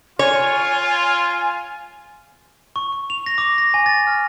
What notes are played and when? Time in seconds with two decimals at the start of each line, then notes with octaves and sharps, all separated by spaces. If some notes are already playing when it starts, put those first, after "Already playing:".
0.19 F4 C#5 G#5
2.76 C#6
2.92 C#6
3.10 F7
3.26 A#6
3.38 D6
3.58 A#6
3.74 G#5
3.86 A6
4.07 F6